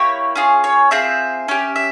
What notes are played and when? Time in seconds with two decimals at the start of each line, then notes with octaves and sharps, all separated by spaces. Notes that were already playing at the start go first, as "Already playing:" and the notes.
Already playing: A#3 E4 G4 C#5
0.35 C#4 F4 G#4
0.64 C#5
0.91 C4 F4 G#4 E5
1.48 C#4 G4
1.76 E5